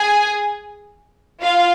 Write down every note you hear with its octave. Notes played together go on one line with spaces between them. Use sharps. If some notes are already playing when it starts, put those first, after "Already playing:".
Already playing: G#4 G#5
F4 F5